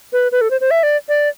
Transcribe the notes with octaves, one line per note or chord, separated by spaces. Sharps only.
B4
B4
A4
C5
C5
E5
D5
D5